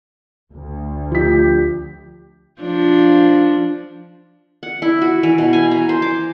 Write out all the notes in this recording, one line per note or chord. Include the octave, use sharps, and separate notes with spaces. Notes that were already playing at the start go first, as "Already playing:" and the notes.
D2
F3 G4 B6
F3 D4
F#5
E4
F#4
E3
B2
G#5
A#5
C5
D6